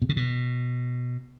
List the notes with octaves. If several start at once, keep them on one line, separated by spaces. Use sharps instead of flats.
B2
C#3
B2